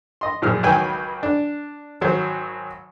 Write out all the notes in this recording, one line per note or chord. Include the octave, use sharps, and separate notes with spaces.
D#5 C6
F#2 A#2 F3 G#4 F6
C#2 D#3 F#3 B4 G5 G#5
D4
G#1 F#3 C5